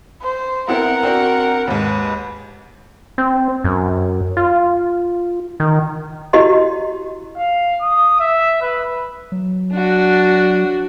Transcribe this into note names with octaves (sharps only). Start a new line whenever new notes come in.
C5
B3 C4 E4 A#4 F#5
C4 D4 F#4
D#2 G#2 B4
C4
F#2
F4
D#3
E4 F#4 G4 D#5 C6
F5
D#6
E5
B4
F#3
D4 F#4